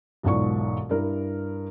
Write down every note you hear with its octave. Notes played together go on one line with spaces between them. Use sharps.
E1 B1 G#2 F4 D5 C#6
G2 E4 A#4